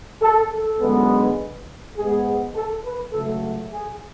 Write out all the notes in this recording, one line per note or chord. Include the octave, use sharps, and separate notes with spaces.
A4
A4
F#2 D3 G#3 B3
G#2 G#3 B3 G#4
A4
B4
C#2 C#3 F#3 A3 A4
G#4